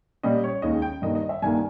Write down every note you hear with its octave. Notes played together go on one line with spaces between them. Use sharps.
A#2 G3 C#4 D#5
C#5
D#2 D#3 G#3 C#4 D#5
G5
G2 D#3 A#3 D#5
D#5
E5
G2 D#3 A#3 G#5